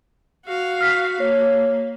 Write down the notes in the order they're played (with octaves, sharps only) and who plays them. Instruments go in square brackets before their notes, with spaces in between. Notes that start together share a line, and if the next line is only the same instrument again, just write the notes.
[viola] F#4 F5
[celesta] F6 B6
[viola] A#3 [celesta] C#5